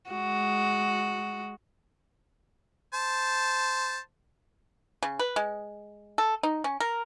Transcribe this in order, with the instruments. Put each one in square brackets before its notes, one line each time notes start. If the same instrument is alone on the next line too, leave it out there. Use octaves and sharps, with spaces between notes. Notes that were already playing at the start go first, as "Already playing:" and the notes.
[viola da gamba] G#3 F#4
[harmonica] C5 A5
[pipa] C#3
B4
G#3
A4
D#4
C#4
A#4